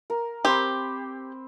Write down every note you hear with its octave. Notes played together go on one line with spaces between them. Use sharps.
A#4
C4 G4 C5 B5